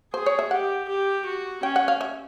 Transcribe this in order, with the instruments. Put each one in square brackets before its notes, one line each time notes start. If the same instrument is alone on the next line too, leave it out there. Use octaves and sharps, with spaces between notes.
[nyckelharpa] G#4 [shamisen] C5
[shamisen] C#5
E5
[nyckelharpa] G4 [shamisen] F#5
[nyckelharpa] G4
F#4
[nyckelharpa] C#4 [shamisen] G5
[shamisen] F#5
F5
E5